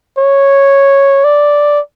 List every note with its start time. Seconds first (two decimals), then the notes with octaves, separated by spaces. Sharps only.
0.19 C#5
1.24 D5